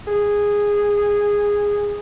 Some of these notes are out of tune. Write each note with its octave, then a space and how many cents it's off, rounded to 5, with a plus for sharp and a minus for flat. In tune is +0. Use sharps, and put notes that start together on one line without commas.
G#4 -10